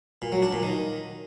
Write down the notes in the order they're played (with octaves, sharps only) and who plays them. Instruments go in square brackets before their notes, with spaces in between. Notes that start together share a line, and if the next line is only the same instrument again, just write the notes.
[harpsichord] A#2
F#3
D4
A#2
D#3